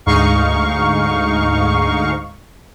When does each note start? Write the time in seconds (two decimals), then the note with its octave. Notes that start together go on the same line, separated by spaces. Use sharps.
0.06 D2 G#2 D#4 F5 C#6